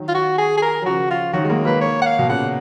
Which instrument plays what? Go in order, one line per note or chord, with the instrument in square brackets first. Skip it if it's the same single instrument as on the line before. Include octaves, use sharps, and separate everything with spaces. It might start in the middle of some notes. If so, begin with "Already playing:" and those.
Already playing: [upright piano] D#3 F#3
[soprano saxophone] F4
F#4
G#4
G#4
A#4
[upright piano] F#3
[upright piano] C#3 F3 [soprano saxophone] F#4
[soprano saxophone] F4
[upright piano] D#3 F#3 [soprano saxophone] F#4
[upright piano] G#3
F#3 A#3
[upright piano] F#3 A#3 [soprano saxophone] B4
[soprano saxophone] C#5
F#5
F5
[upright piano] B2
[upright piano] A#2 C#3 [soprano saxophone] F#5